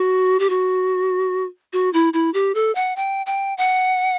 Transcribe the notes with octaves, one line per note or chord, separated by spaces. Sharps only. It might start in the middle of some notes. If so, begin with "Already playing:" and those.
Already playing: F#4
G4
F#4
F#4
E4
E4
G4
A4
F#5
G5
G5
F#5